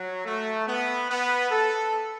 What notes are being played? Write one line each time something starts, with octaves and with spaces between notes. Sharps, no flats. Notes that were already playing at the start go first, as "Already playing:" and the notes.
Already playing: F#3
A3
B3
B3
A4